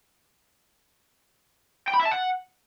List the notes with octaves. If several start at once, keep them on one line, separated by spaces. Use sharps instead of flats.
G5
B5
E5
A5
F#5